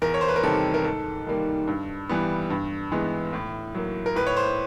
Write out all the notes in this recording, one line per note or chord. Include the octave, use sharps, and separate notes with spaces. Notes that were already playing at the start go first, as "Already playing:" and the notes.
E2 A#4
C#5
C5
B4
A#4
C3 D#3 G3 A4
A#4
G#2 A4
D#3 G3 A#3
G2
E3 G3 B3
G2
E3 G#3 B3
A2
F#3 A#3
A#4
A2 B4
C#5
C5